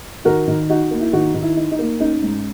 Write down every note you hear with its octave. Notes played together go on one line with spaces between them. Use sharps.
D#3 F#4 A#4
D#3
D#4 F#4
A#3
E4
D#3 D#4 F#4
D#3
E4
D#4
D#4
A#3
C#4 D#4
G#2